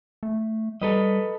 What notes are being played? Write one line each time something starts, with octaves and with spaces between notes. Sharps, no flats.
A3
G3 A4 B4 D#5